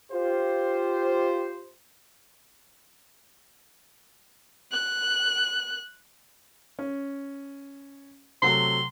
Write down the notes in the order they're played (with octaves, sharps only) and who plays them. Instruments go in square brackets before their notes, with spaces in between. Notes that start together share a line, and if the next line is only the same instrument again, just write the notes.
[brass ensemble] F4 G4 C5
[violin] F#6
[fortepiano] C#4
[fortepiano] C3 F#3 A3 [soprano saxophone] C6